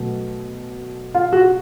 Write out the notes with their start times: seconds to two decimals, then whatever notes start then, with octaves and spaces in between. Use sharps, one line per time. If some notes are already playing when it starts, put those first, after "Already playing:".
Already playing: B2 F#3 A3
1.15 F4
1.33 F#4